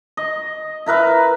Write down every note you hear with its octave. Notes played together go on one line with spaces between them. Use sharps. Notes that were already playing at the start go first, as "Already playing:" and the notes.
D#5
E4 A#4 B4 E5